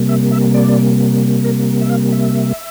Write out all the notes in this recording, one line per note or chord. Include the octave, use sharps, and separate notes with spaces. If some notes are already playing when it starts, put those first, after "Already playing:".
Already playing: C3 G3 A#3
E5
E5
D5
A#4
E5
F5
E5